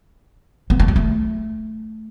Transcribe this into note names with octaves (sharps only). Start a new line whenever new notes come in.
B3
A3
G#3
A3